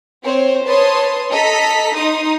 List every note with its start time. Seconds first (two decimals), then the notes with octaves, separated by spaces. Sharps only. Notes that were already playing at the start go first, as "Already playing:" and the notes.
0.24 C4 C5 C#5
0.65 B4 C#5 A5 C6 D#6
1.32 A4 D#5 A#5 B6
1.96 D#4 C6 D#6